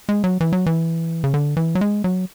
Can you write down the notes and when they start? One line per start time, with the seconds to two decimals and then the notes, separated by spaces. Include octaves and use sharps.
0.09 G#3
0.24 F#3
0.41 E3
0.53 F#3
0.66 E3
1.24 C#3
1.34 D3
1.57 E3
1.75 F#3
1.81 G#3
2.04 F#3